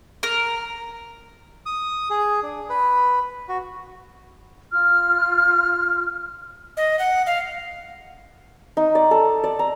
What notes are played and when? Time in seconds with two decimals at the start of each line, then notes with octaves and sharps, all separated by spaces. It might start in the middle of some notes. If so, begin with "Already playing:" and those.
0.23 A#4
1.66 D#6
2.10 G#4
2.43 D4
2.70 B4
3.49 F#4
4.72 F4 F6
6.77 D#5
6.99 F#5
7.26 F5
8.77 D#4
8.95 D5
9.11 A4
9.44 D5
9.59 A#5